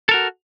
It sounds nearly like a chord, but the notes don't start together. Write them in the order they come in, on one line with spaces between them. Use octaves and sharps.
A4 A#4 F#4